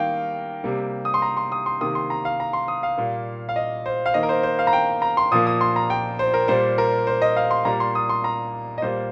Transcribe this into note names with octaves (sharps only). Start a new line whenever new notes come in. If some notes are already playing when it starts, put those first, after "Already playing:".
Already playing: D#3 G3 A#3 F5 G5
C3 G3 A#3
D#6
C6
A#5
C6
D#6
C6
C3 D#3 A#3 D#6
C6
A#5
F5
A#5
C6
D#6
F5
A#2 G3 A#3
F5
D#5
C5
F5
D#3 A#3 D#5
A#4
C5
C5
F5
A#5
G5
A#5
C6
A#2 F3 A#3 D#6
D#6
C6
A#5
G5
C5
A#4
A#2 G3 A#3 C5
A#4
C5
D#5
F5
C6
A#2 G3 A#3 A#5
C6
D#6
C6
A#5
D#5
A#2 G3 A#3 C5